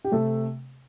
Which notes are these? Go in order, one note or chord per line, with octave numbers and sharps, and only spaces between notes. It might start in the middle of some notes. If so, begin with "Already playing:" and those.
G4
C3 A3 A4